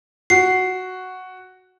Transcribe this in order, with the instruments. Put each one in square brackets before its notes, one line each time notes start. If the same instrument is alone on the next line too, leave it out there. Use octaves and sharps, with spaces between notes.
[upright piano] F#4 [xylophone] C7